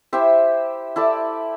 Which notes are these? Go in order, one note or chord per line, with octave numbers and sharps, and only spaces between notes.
E4 G4 C5 E5
E4 A4 D5